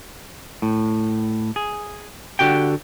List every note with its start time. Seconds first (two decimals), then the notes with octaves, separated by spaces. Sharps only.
0.62 A2
1.56 G#4
2.39 D3 F#4 G4 G5